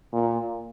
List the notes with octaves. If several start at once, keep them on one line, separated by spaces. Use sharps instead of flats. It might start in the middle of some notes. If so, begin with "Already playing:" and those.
A#2